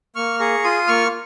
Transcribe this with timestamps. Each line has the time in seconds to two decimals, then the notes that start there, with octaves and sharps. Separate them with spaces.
0.15 A#3 C#6 F6
0.39 G#4 A#5 C#6
0.64 F4 C6 D#6
0.87 A#3 C#6 F6